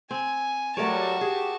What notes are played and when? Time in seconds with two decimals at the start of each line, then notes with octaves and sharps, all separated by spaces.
0.11 C4 G#5
0.77 F#3 G3 A3 F#4 A#4 C#5 A5
1.21 G4 G#4